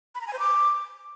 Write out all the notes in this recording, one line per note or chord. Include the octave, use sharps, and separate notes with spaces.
B5
A#5
G#5
C5
D6